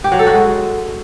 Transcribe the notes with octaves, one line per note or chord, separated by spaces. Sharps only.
G4
F#3
A4
F#4
G#3